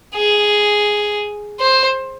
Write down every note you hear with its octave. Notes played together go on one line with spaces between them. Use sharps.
G#4
C5